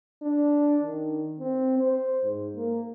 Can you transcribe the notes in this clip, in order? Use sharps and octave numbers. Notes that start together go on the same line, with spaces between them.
D4
D#3
C4
C5
G#2
A#3